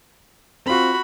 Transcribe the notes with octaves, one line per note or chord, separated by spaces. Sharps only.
C4 F4 F#4 B5